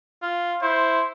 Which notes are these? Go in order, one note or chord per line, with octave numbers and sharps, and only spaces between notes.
F4
E4 C5